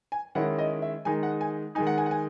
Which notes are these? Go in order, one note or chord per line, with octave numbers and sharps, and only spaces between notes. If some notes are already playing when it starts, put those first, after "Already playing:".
G#5
D#3 G#3 C#4 E4 F#5
D#5
E5
D#3 G#3 D#4 G#5
F#5
G#5
D#3 G#3 D#4 G#5
F#5
G#5
F#5
G#5